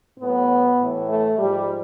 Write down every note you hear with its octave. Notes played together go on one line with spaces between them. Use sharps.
A2 F#3 B3
A2 E3
A3
G#2 F3 G3